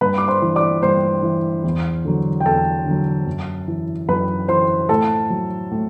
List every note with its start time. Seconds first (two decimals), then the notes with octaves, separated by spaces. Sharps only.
0.01 G2 B4 B5
0.18 D6
0.28 C5 C6
0.42 E3
0.55 D5 D6
0.82 G2 C5 C6
1.23 E3
1.64 E2
2.05 D3 F#3
2.40 G5
2.45 E2 A4 A5
2.86 D3 F#3
3.26 F#2
3.68 E3
4.08 F#2 B4 B5
4.48 E3 C5 C6
4.89 A2 A4 A5
5.30 F#3
5.71 A2